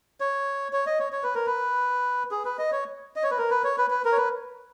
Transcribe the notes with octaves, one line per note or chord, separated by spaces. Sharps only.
C#5
C#5
D#5
C#5
C#5
B4
A#4
B4
G#4
B4
D#5
C#5
D#5
C#5
B4
A#4
B4
C#5
B4
B4
A#4
C#5
B4